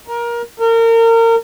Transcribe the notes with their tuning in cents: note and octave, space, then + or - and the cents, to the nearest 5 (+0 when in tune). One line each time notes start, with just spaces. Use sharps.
A#4 +20
A#4 -30